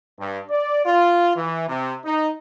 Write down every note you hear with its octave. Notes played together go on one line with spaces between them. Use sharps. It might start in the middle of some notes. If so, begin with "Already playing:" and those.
G2
D5
F4
E3
C3
D#4